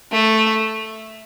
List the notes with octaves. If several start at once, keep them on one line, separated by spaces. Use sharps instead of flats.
A3